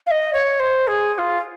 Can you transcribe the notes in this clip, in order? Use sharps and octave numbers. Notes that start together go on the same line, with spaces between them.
F5
D#5
C#5
C5
G#4
G#4
F4